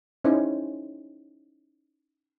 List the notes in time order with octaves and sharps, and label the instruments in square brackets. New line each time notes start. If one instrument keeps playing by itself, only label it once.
[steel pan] C#4 D#4 E4 G#4 C5 C#5